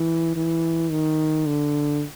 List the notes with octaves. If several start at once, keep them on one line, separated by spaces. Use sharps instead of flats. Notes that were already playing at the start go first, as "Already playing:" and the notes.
Already playing: E3
E3
D#3
D3